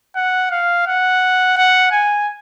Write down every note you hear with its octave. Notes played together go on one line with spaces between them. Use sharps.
F#5
F5
F#5
F#5
G#5